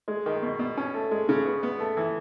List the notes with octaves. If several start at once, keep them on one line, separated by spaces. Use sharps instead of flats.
G#3
D#3
B2
B2
C#4
A3
G#3
C#3
B3
B3
A3
E3